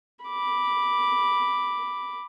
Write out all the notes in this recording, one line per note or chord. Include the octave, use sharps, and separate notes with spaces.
B5 D6